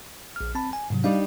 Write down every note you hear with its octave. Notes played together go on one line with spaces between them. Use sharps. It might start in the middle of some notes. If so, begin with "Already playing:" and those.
A#1 F6
C4 A5 B5
G#5
G#2 C3 F#3
G3 D4 D#4 F5